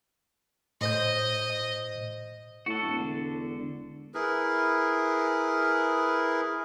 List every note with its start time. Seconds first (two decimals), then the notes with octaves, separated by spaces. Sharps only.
0.81 A2 C5 D#5 G6
2.66 A2 F#4 A4
2.82 E1
2.99 D3
4.14 E4 G#4 A#4 B4